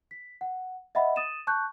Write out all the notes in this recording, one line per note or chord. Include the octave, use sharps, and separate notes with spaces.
B6
F#5
D#5 E5 F#5 B5
D#6 A6 D#7 E7
A5 C#6 F#6 G6